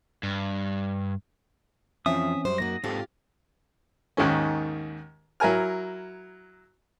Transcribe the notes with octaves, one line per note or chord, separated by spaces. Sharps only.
G2
F2 E3 F3 C4 C#4 E5 D#6
F#2 G3 C5
G#2 A#3 F#4 A#6
G#2 C4 F4 G4 A4
D#2 G#2 D#3 C#4
F#3 E4 A#4 G#5 F6